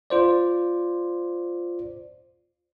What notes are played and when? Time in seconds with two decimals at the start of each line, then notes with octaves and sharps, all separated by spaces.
0.10 F4 C5 D5